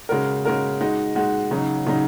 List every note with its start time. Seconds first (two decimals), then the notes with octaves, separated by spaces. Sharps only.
0.09 C#3 G#3 F#4 A#4
0.45 C#3 G#3 F#4 A#4
0.81 G#3 D#4 F#4
1.15 G#3 D#4 F#4
1.51 C#3 F#3 D#4
1.87 C#3 F#3 D#4